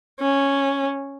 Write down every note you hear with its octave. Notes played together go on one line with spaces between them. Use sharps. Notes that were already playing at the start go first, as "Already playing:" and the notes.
C#4